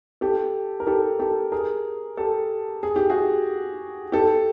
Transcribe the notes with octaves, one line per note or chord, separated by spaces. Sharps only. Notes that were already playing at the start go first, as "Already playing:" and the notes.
G4 A4
A#4
G4 A4
G4 A4
G#4 A#4
G4 A4
G#4
G4
F#4 G#4
G4 A4